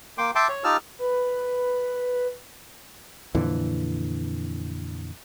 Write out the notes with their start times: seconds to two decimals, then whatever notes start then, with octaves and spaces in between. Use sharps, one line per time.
0.18 A#3 G5 C6 D6
0.35 E5 G5 A5 C6 D6
0.49 C#5
0.64 D#4 F4 G4 A5 E6 F6
0.99 B4
3.35 F2 A#2 D3 E3